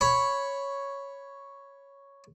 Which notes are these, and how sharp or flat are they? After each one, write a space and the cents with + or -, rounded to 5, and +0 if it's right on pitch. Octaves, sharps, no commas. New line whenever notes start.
C#5 +0 B5 +0